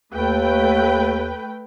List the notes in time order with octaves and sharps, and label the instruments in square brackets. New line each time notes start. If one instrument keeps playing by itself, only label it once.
[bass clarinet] D#2 [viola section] A3 B4 G5